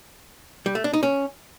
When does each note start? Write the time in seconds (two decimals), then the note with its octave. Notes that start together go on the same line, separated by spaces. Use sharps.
0.66 G3
0.75 A3
0.84 D4
0.93 D#4
1.03 C#4